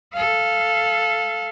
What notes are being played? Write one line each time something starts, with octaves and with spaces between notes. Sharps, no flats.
A4 F5